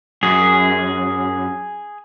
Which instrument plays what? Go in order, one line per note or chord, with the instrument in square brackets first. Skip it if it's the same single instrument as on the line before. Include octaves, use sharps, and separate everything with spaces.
[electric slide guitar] F#2 [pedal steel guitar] G#4